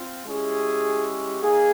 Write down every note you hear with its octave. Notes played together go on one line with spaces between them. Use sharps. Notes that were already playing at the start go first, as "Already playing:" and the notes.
Already playing: C4 F4
G#3 C#4 E4 G4 G#4
A#3 D#4 G#4